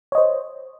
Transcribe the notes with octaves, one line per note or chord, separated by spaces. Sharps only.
C5 C#5 D#5